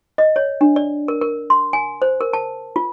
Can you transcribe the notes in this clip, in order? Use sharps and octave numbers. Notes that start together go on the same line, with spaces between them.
D#5
C#5
D4
D5
A#4
A#4
C6
G#5
C5
A#4
A5
F4